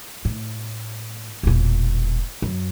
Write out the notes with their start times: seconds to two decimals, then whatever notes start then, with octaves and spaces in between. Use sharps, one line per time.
0.25 A2
1.43 E1 A#2
2.42 F#2